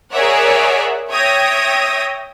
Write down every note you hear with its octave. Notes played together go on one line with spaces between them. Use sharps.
G#4 A#4 C#5 D5 E5 F#5
C#5 E5 G5 D#6 G#6 A#6